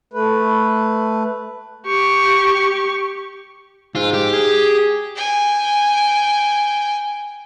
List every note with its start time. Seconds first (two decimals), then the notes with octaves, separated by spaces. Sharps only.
0.13 A3 B4
1.86 G4 C#6
3.95 G#2 F4
4.13 G4
4.33 G#4
5.16 G5 G#5